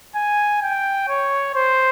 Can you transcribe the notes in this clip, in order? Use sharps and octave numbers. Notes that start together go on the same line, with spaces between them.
G#5
G5
C#5
C5